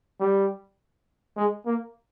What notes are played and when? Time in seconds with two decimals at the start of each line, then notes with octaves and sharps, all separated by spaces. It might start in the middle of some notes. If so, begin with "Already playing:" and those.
0.20 G3
1.36 G#3
1.66 A#3